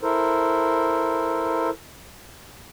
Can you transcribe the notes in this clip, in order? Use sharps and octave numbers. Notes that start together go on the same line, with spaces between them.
E4 A4 A#4 C5